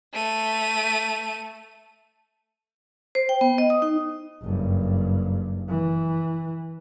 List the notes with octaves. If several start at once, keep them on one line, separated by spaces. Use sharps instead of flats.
A3 D#7
C5
G5
B3
D#5
D#6
D#4
F#1 G2
E3